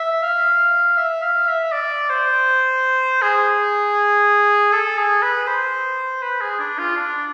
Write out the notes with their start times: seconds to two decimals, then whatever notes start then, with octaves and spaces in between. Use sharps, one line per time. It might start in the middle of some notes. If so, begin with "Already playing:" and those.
Already playing: E5
0.22 F5
0.97 E5
1.22 F5
1.48 E5
1.72 D5
2.09 C5
3.22 G#4
4.72 A4
4.97 G#4
5.22 B4
5.47 C5
6.22 B4
6.41 G#4
6.60 D4
6.79 F4
6.97 D4